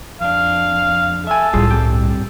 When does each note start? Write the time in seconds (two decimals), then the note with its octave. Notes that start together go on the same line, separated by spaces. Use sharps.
0.21 F2 D4 F5
1.27 A4 E5 G#5
1.54 C2 A2 G3 F4 G#4
1.71 G2 C4 G4